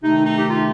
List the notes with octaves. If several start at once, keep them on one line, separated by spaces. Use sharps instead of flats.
C3 D#3 A3 D#4
D#4
G4
F4